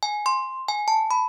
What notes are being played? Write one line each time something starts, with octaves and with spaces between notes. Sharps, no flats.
G#5
C6
G#5
A5
B5